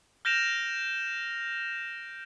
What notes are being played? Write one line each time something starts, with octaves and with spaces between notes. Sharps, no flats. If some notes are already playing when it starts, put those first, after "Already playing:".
F6 G6 A#6 D7 E7 F7